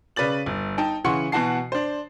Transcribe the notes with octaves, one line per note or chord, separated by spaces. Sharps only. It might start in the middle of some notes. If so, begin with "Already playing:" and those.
C#3 B4 D5 A6 F#7
G1
D#4 G5 A5
C#3 E3 F#5 C6 C#6 C#7
B2 E3 F#4 F#5 A5 C7
D4 C5